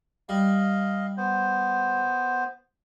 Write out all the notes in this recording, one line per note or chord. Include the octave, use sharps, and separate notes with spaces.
G3 D#5 F5
B3 C5